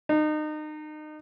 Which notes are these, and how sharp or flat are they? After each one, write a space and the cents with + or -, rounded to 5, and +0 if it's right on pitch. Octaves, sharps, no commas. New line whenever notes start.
D#4 -30